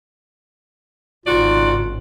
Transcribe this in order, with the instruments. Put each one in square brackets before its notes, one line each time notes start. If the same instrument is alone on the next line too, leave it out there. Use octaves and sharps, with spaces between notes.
[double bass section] G#1 C#3 [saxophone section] G#2 F#4 D5 [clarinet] F4